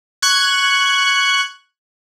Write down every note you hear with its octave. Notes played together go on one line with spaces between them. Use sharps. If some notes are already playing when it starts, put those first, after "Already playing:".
C#6 F#6 G#6